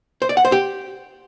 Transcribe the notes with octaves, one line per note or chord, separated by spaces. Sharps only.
C5
D5
F#5
C5
G4